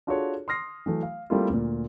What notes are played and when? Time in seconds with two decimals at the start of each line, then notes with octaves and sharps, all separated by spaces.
0.07 D4 F4 F#4 G#4 A4 C#5
0.48 C6 D#6 F6 A#6 C7
0.86 E3 F#3 A3
1.03 F5
1.30 G3 A3 A#3 C4 E4 F4
1.49 D2 A#2